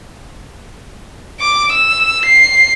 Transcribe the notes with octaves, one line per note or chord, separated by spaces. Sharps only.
D6
E6
C7